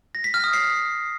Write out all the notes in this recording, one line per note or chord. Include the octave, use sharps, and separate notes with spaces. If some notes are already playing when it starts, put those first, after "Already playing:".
A#6
B6
F6
D#6
C7